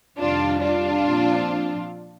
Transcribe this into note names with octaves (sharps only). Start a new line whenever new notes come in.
F2 C3 D#3 G3 D4 F4
D4 F4
A#2 F3 C4